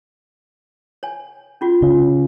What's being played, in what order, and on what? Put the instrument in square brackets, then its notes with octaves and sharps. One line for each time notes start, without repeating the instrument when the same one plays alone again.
[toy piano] C#5 G#5
C#4 F4 F#4
[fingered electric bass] C#3 [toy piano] F4